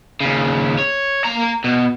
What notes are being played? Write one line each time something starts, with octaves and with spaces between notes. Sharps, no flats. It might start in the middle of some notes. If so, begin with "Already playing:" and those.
D#2 C#3
C#5
A#3 A#5
B2